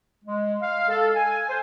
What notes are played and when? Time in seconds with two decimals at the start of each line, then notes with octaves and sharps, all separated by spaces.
0.24 G#3
0.62 F5
0.89 A4
1.16 G#5
1.49 C5